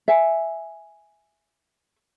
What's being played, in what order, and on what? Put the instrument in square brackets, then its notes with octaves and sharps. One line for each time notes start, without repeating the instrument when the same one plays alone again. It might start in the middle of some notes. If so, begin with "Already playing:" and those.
[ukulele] E5 G#5